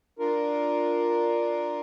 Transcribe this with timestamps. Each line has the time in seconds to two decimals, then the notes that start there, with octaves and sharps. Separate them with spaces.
0.19 D4 F4 A#4